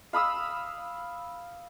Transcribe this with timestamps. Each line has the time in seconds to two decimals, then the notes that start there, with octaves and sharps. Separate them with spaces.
0.13 F5 B5 D#6 E6